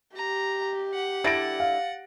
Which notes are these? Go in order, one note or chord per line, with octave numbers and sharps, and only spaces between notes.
G4 A#5
F#5
D3 G3 E4 A6 A#6 D7
F5